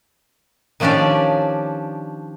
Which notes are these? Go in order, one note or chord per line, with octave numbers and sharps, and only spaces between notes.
D#3 F3 C#4 D4 G4 D5